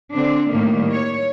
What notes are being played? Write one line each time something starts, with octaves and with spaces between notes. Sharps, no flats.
D3 C4 D4
A2 D#3 G3 A#3
C#5